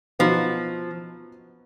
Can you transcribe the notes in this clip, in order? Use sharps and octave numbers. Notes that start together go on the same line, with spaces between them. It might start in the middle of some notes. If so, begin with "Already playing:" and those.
B2 F3 F#3 B3 D#4